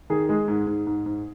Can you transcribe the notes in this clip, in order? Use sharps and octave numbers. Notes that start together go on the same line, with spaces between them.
D#3 G#4
G#3 G#4
G#2
G#2
G#2
G#2